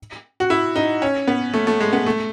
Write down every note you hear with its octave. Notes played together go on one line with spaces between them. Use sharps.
F#4
E4
D#4
C#4
B3
A3
A3
G#3
B3
A3